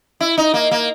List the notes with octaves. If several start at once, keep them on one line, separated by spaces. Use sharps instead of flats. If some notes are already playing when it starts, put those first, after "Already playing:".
E4
D#4
A#3
A#3